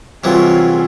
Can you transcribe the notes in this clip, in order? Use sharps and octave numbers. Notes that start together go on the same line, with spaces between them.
C2 E3 F#3 F4 G#4